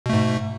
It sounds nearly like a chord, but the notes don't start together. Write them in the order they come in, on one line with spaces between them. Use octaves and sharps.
B2 A3 G#2